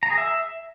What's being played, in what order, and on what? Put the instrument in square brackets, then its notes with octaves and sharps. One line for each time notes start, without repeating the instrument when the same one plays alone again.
[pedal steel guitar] A#5
G#4
E5